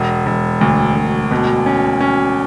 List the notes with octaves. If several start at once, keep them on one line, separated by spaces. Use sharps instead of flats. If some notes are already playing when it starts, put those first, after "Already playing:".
Already playing: E1
E1
D2
E1
B2
C#4
C#4